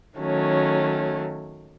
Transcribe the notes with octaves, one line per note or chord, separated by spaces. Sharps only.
D#3 F#3 A3 C#4